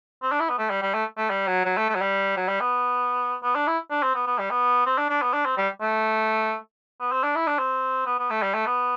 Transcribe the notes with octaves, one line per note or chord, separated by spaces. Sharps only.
C4
D4
E4
B3
A3
G3
G3
A3
A3
G3
F#3
F#3
A3
A3
F#3
G3
F#3
G3
B3
B3
D4
E4
D4
C4
B3
B3
G3
B3
C4
D4
D4
B3
D4
C4
G3
A3
B3
C4
D4
E4
D4
C4
B3
B3
A3
G3
A3
B3